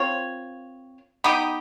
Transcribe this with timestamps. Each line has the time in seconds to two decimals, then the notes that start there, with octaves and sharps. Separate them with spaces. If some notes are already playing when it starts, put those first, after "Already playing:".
Already playing: C4 F4 A#4 C#5
1.24 B3 D#4 G4